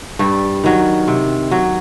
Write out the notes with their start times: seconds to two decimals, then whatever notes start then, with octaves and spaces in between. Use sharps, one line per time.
0.19 G2 G3
0.64 D#3 F#3
1.08 C3
1.51 F#3